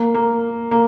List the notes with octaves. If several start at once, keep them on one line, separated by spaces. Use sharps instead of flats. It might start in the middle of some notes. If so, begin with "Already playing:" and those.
Already playing: A#3
A#3
A#3